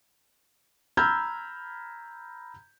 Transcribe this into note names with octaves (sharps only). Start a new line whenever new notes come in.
A#5 B5 E6 F6 G6 G#6